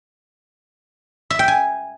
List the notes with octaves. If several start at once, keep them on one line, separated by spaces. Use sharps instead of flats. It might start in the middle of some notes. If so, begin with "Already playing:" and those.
E5
G5
G#5